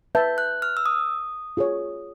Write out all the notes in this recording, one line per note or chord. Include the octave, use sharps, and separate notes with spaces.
B4 E5 A5 G6
F#6
F6
E6
D#6
F4 G#4 C#5